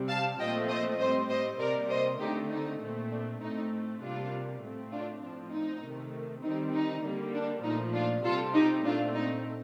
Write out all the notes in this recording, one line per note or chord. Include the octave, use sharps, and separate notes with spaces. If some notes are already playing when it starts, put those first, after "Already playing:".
Already playing: C3 G3 C4
F5 A5
A#2 F3 A3 C4 D#5 G5
C5 D#5
A2 G3 C4 C5 D#5
C5 D#5
C3 G3 A#3 A#4 D5
C5 D#5
D3 A3 C4 D#4 G4
D#4
A#2 A3 C4
D4
A2 A3 C4 D#4
C3 G3 A#3 D4 F4
A2 A3 C4
D4 F4
A2 F3 C4 D4
D#4
C3 D#3 A3
D#3 G3 C4 D#4
D#4
D3 G3 A#3
D4
A#2 F3 A3 D#4
D4 F4
C3 G3 C4 F4 A4
D#4 G4
A#2 A3 C4 D4 F4
D#4